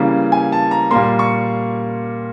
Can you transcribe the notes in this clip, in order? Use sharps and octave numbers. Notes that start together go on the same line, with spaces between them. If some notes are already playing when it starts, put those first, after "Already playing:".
Already playing: C#3 E3 G3 A#3 C#4
G#5
A5
A#5
A#2 G3 A#3 C6
C#6